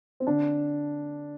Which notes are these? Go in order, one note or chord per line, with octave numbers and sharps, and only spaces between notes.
C4
D3 D4